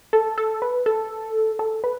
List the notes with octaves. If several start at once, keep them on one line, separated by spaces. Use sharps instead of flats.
A4
A4
B4
A4
A4
B4